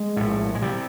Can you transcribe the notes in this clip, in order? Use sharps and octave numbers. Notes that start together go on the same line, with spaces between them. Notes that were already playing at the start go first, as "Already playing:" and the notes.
Already playing: G#3
A#1 A2
G#3
C3 G3